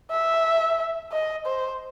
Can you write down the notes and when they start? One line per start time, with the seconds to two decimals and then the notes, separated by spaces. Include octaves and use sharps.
0.11 E5
1.13 D#5
1.46 C5